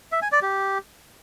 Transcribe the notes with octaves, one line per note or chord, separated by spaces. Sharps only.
E5
G#5
D5
G4